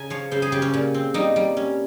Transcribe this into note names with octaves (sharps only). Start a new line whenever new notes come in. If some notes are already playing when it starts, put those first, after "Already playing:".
Already playing: C#3 C#4 G#5 A#5
F3 C#5
C#3 C5
G#4
C#3 G4
C#4
A#2
C4
G3 D#4
G3
C#4